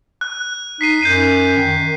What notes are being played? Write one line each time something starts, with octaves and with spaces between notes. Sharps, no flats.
F#6
D#4 B6 C7 D#7
F#2 G6 C7 D#7
D#3